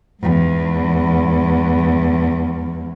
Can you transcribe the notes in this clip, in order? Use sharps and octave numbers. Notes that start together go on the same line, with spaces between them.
E2 G#2